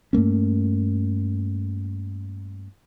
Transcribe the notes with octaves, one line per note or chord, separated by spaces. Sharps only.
G2 A3 A#3 C#4